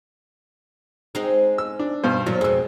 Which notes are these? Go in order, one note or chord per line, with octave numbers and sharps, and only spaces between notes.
G#3 C4 D#4
E6
D4
G2 B2 C5
A#2 F3 F#3
F2 B2 G#3 E6